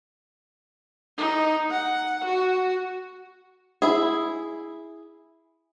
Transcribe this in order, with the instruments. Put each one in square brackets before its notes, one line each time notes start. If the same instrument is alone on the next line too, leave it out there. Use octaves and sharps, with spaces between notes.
[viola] D#4
F#5
F#4
[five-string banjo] E4 G#4